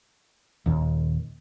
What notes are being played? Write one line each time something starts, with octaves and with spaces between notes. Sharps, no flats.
D#1 D#2